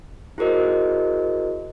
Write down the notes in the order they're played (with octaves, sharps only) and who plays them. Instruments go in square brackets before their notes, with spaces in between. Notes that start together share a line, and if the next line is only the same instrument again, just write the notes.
[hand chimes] E4 F#4 G#4 A#4 C5 D#5